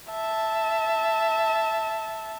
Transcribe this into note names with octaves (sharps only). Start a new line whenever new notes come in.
E5 A5